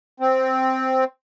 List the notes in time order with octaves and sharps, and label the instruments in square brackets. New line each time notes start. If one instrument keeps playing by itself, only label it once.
[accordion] C4